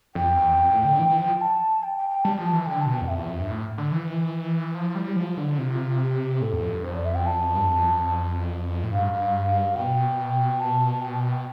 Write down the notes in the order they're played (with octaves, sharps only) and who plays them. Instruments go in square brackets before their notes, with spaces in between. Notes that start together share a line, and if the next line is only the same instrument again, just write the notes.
[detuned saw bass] F2 [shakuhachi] G5
[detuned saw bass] E2
F2
A2
D3
E3
E3
F3
[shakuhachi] A5
G5
G5
G5
[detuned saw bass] G3 [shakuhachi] A5
[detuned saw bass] F3 [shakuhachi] A5
[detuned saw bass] E3
[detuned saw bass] D3 [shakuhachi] G5
[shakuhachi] A5
[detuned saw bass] B2
[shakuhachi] G5
[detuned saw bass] E2
[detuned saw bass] F2 [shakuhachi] E5
[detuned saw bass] E2
F2
G2
A2
D3
E3
[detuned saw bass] F3 [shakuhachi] E4
[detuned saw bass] G3
F3
D3
[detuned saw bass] C3 [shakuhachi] F4
[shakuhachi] F4
G4
[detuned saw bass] A2 [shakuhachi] A4
[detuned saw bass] E2
F2
G2
[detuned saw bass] F2 [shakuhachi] C5
[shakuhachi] D5
E5
G5
A5
[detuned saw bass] G2
F2
A2
[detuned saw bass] G2 [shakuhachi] F5
[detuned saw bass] G2
[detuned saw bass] B2 [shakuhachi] G5
[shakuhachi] A5
G5
A5
G5